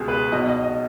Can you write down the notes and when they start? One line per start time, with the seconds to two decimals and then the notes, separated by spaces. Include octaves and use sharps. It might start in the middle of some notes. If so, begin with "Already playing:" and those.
Already playing: C#2 B2 G4 G#4
0.08 B4
0.31 B1 B2 D#5
0.47 D#5
0.63 D#5